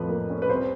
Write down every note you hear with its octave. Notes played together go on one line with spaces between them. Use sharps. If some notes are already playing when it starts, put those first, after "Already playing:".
Already playing: F2 A2 F3 B4
A#3
C#4
B4
C2 C5